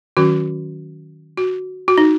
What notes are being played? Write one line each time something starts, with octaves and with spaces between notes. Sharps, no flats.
D#3 F#3 C#4 F#4
F#4
F#4
D#4